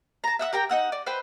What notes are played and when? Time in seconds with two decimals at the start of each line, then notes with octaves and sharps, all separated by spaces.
0.24 A5 A#5
0.39 E5 F#5 D#6 E6
0.53 G4 A#4 G5 A#5
0.70 D#4 F#5 E6
0.92 D5
1.06 B4 C5 E5 G5